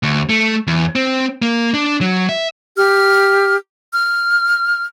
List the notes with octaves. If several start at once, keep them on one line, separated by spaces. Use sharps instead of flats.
D2
A3
E2
C4
A#3
D4
F#3
E5
G4 F6
F6